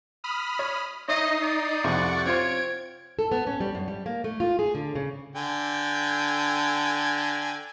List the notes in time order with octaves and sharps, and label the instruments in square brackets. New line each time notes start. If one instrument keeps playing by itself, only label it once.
[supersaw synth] B5 D#6 F6
[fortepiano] C#5
[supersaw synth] D#4 D#6 C7 [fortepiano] C#5 E5 [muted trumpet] D#5
[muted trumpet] D5
[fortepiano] C2 F2 C3 [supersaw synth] F#5 C#6
[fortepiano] C4 F4 C5 [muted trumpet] C#5 [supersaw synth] G#6 D7
[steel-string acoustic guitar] A4
B3
C#4
G3
F#2
G3
A#3
A3
F4
G#4
D3
C#3
[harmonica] D3 G5 G#5